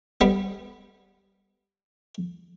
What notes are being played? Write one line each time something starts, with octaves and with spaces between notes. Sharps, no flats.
G3 B3